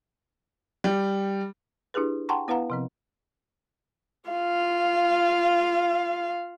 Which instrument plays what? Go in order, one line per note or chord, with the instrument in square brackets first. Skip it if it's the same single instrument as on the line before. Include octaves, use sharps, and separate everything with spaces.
[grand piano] G3
[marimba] D4 E4 G4 G#4 B4
F#5 G5 A5 A#5 C6 C#6
B3 E4 B4 F5 F#5 A#5
C3 F3 C4
[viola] F4 F5